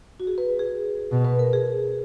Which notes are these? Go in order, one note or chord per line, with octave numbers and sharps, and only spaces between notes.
F#4
G#4
B4
G#4
B2
B4
A#4
G#4